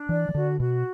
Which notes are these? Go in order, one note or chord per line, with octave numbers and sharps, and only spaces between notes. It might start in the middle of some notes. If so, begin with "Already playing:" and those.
Already playing: D4
E3 D5
E3
D3 F#4
B2 F#4